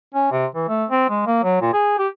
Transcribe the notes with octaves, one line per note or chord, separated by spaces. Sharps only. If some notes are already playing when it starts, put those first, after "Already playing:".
C#4
C3
E3
A3
C4
G#3
A#3
F#3
A#2
G#4
G4